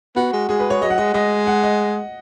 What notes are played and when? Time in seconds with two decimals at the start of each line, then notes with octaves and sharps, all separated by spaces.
0.16 B3 F#4
0.33 G#3
0.49 G#3 G#4
0.60 B4
0.70 C#5
0.82 F#3 D#5
0.90 F#5
0.98 G#3 D#5
1.14 G#3 D#5
1.47 F#5
1.63 D#5